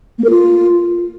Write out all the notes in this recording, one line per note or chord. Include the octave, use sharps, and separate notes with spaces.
A#3
A#4
F4